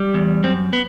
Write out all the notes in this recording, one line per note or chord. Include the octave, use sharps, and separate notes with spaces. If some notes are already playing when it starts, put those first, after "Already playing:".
Already playing: G3
E2
F#2 C4
B3